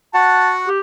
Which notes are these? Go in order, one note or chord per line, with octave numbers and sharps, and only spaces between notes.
F#4 F#5 A5
G4